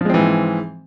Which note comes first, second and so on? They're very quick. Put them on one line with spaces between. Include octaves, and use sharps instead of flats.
F3 G#3 C4 E3 G#2